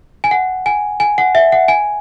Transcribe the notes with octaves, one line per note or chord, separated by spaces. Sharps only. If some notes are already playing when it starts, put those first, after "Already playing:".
G#5
F#5
G#5
G#5
F#5
E5
F#5
G#5